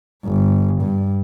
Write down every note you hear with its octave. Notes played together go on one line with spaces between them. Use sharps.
G1
G2